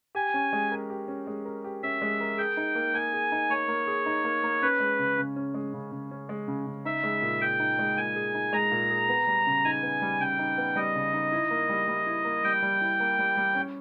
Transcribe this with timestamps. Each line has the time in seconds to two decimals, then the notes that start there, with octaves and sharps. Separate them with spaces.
0.15 G4 G#5
0.34 C#4
0.53 G#3
0.71 A#4
0.90 G4
1.08 C#4
1.27 G#3
1.45 A#4
1.64 G4
1.83 C#4 E5
2.02 G#3
2.20 A#4
2.38 G#4 G5
2.57 D#4
2.75 A#3
2.94 A#3 G#5
3.13 G#4
3.32 D#4
3.50 A#3 C#5
3.68 A#3
3.87 G#4
4.06 D#4
4.24 A#3
4.44 A#3
4.62 C#4 B4
4.80 G#3
4.99 C#3
5.18 C#3
5.36 C#4
5.54 G#3
5.74 C#3
5.92 C#3
6.11 C#4
6.29 G#3
6.48 C#3
6.67 C#3
6.85 D#4 E5
7.04 G#3
7.22 A#2
7.41 G#4 G5
7.60 D#4
7.79 G#3
7.97 A#2 G#5
8.16 G#4
8.35 D#4
8.53 G#3 A#5
8.71 A#2
8.90 G#4
9.09 B3
9.27 G3
9.47 C#3
9.64 D#4 G#5
9.83 B3
10.02 G3
10.20 C#3 G5
10.39 D#4
10.58 B3
10.76 G3 D#5
10.96 C#3
11.14 D#4
11.32 E4
11.50 A#3
11.70 G3
11.88 G3
12.07 E4
12.25 A#3
12.44 G3 G5
12.62 G3
12.81 E4
13.00 A#3
13.19 G3
13.37 G3
13.55 C#4